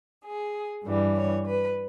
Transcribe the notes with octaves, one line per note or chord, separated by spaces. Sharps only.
G#4
G2 E3 G3
C#5
B4